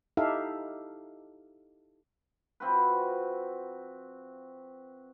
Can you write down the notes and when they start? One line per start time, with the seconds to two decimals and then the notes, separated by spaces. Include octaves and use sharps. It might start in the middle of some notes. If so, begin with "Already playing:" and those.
0.17 D#4 E4 G4 A4 E5 F5
2.60 F3 C4 F#4 B4